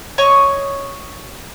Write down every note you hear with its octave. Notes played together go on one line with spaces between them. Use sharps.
C#5 D#5 C#6